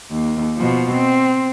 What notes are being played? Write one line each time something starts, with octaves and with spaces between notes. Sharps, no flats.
D#2
B2 F3
C4